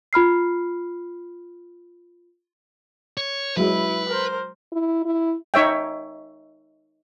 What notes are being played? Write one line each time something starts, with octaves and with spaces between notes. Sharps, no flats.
F4 B5 F6 C7
C#5
F#3 G#3 E4 B4
A#4 C5
E4
E4
D#4 C#5 E5 G5